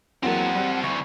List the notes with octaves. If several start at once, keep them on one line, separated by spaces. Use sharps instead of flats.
E2 F#3 A#3 C4 F#5 A5
G3
D2 E3 C#6